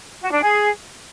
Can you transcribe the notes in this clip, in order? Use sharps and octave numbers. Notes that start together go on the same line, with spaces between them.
F#4
D4
G#4